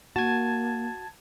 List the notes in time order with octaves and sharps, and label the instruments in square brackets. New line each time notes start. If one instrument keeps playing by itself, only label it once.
[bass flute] A#3 [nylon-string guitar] F#4 [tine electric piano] A5 G#6